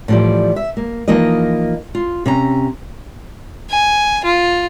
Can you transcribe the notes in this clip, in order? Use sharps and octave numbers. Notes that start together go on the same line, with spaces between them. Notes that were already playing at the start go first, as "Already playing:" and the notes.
A2 E3 F3 G3 D5
E5
A#3
E3 F3 A#3 D#4 D#5
F4
C3 C#4 A#5
G#5
F4